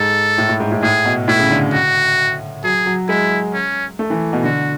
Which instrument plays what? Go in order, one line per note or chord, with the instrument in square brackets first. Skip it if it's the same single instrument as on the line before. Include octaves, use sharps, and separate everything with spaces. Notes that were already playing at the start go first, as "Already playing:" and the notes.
Already playing: [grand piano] G#2 [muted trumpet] A4
[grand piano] A2
A2
G#2
A2
[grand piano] A2 [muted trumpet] G#4
[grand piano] B2
[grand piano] A2 [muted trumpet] E4
[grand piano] C#3
D3
[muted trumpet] F#4
[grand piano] F#3 [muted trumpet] G#4
[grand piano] F#3
[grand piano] G#3 [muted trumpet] E4
[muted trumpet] C#4
[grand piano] A3
E3
B2
[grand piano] D3 [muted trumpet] F#4